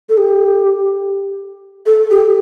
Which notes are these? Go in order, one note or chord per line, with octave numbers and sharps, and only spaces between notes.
A4
G4
A4
G4